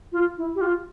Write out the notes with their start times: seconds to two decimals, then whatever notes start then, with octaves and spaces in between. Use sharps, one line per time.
0.12 F4
0.38 E4
0.55 G4
0.61 F4